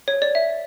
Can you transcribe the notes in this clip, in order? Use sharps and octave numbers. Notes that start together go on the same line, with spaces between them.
C#5
D5
E5